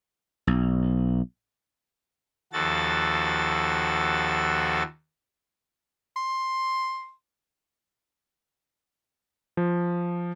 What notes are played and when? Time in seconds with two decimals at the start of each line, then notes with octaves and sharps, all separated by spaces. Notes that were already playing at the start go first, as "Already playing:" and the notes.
0.47 B1
2.53 D#2 F3 F#4 A4 A6
6.16 C6
9.57 F3